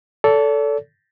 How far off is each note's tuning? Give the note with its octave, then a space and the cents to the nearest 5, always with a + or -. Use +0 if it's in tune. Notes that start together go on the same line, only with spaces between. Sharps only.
A4 +0 D5 -45